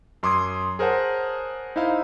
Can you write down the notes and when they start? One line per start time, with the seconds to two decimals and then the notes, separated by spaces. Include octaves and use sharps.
0.23 F#2 C6 D6 D#6 G#6 C7
0.79 G#4 A#4 C5 C#5 F#5 A5
1.76 D#4 E4 C5 E5 F5